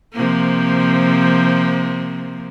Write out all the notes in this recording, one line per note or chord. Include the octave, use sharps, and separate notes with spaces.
C3 F3 A#3